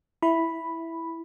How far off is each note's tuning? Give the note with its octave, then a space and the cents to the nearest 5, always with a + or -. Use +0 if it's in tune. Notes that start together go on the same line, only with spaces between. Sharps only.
E4 +0 B5 +0